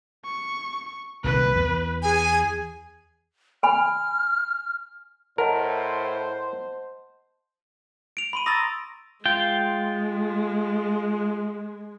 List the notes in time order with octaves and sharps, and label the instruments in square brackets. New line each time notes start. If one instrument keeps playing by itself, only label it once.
[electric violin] C#6
[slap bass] C2 A#2 D#3 [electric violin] B4
[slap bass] E2
[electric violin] G#4 [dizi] G#5
[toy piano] G#5 B5 [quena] F6
[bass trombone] A2 [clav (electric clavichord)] A#4 [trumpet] C5 [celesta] D#5 F#5 A5
[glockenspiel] D7 F7
B5 C6 D#7
[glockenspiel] A#5 C#6 A#6 [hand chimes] D#6 E6 A6
[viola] G#3 [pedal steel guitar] F4 G5